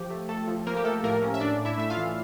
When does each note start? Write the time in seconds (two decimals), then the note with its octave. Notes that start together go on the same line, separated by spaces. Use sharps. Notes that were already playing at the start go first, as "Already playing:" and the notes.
Already playing: F3 G4
0.10 A3
0.29 A3 A4
0.48 F3
0.66 F3 A#3 A#4
0.77 G4
0.84 A3 A4
1.03 A2 A#3 A#4
1.22 C#4
1.34 E5
1.40 A2 D4 D5
1.59 A2
1.65 E4 E5
1.78 A3 E5
1.90 F4 F5
1.97 E3